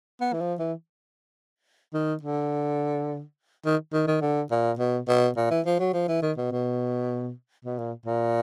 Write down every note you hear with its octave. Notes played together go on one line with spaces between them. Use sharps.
B3
E3
F3
E3
D#3
D3
D#3
D#3
D#3
D3
A#2
B2
B2
A#2
E3
F3
F#3
F3
E3
D#3
B2
B2
B2
A#2
A#2